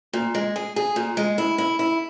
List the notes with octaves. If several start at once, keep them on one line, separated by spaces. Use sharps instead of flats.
A#2
G#3
G#4
G#4
A#2
G#3
E4
E4
E4